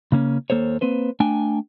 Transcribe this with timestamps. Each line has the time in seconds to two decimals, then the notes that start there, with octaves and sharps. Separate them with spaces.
0.12 C#3 A#3 C#4
0.50 D#2 A#3 A4 C5 C#5
0.81 A#3 C4 B4 C5
1.20 A3 D4 G5 G#5